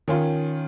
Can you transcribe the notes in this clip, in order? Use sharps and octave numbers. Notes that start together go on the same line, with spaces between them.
D#3 C#4 F4